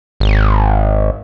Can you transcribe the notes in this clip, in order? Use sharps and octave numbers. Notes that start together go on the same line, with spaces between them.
G#1